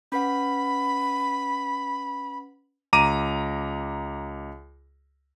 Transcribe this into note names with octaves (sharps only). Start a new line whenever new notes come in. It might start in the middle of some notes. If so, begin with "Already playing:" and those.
C#4 B4 F#5 B5
C#2 A#5 D6 D#7